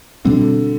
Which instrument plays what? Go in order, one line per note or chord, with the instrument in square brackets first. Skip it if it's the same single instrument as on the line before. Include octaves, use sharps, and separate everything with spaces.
[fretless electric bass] B2 G3 C4 [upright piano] D3